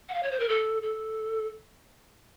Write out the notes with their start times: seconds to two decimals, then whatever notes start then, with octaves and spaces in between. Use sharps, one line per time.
0.09 F#5
0.14 F5
0.23 C#5
0.31 C5
0.40 A#4
0.49 A4
0.83 A4